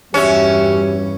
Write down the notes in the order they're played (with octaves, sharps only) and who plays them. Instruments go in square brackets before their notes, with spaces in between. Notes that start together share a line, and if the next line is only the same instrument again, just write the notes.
[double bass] E2 G2 [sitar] C#4 [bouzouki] F#4 E5 [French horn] G4